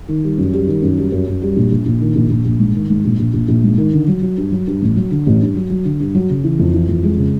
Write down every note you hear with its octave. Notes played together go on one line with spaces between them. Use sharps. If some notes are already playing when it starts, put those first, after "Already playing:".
D#3
G3
F#2
G3
D#3
F#2
G3
F#2
F#2
G3
A#1
A#1
A#1
D#3
A#1
A#1
A#1
G#2
D#3
G#2
A#1
A#1
A#1
A#1
G#2
D#3
D3
F#3
F#3
G2
F#3
G2
A1
F#3
D3
A1
G2
F#3
F#3
D3
G2
F#3
C#3
E3
F2
E3
F2
G#3
C#3